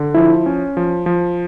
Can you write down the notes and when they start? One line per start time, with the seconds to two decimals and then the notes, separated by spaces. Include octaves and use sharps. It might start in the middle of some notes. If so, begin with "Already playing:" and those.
Already playing: D3
0.15 F3 E4
0.46 C#4
0.77 F3
1.06 F3